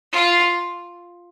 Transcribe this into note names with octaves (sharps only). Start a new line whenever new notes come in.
F4